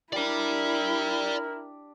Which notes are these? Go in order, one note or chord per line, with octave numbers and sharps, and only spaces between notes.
D4 E4 G4 A#4 D5 G5